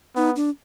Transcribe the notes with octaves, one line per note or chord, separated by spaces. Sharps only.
B3 D#4
D4